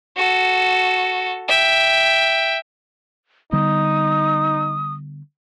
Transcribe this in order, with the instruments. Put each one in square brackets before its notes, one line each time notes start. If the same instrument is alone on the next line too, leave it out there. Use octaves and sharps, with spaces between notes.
[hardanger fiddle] F#4 A4
E5 G5
[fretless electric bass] D3 G3 B3 [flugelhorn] D#4 [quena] D#6